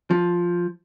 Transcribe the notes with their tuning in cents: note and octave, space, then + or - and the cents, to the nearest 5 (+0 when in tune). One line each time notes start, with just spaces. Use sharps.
F3 +5